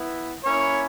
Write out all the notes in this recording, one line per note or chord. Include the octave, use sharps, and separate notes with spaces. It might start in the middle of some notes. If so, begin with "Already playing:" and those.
Already playing: B3 E4
A#3 C#4 E4 C#5